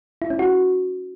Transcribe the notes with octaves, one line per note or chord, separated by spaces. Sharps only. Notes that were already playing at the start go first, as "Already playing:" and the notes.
E4
C#4
F#4